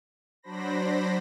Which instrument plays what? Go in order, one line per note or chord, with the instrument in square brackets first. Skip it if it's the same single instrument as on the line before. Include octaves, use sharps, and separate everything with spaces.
[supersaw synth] F#3 D4 C5 B5 A#6